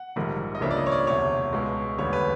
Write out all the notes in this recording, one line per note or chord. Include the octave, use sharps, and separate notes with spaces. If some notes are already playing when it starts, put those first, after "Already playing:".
Already playing: F#5
A#1 G#2 D#3 G3 A#3
D#5
C#2 C#3 F3 A#3 D4 E5
D5
D#5
C#5
D5
E1 D2 C3 C#5
C#2 B2 G#3
E1 D#2 D3 G3 B3 C#5
B4